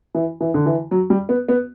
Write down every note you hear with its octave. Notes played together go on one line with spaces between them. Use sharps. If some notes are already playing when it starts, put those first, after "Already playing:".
E3
E3
D3
E3
F#3
G3
B3
B3